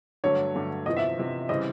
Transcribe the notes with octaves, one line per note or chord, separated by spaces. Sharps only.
G2 D3 F#3 A3 C#5
G2 D3 F#3 A3
E2 C3 F3 D#5
E5
E2 C3 F3
C#3 E3 G3 C4 D#5